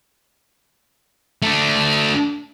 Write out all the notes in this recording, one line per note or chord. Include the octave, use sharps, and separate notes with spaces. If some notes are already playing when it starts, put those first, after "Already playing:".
A3 D4